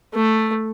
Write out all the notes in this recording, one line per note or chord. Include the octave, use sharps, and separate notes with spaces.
A3